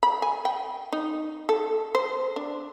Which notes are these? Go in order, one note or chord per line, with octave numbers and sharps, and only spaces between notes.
B5
G#5
G5
D#4
A4
C5
D4